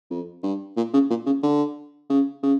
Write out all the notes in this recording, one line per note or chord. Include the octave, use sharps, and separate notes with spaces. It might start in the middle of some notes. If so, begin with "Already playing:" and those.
F2
G2
A#2
C#3
A#2
C#3
D3
C#3
C#3